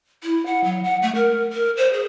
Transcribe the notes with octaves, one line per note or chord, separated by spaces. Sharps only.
E4
F#5
F#3
F#5
A3
A#4
A#4
C5
G#4